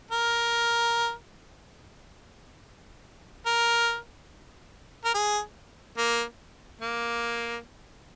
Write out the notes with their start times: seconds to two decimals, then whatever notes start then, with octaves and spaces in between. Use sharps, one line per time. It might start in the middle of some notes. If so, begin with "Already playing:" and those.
0.11 A#4
3.46 A#4
5.05 A#4
5.14 G#4
5.98 A#3
6.81 A#3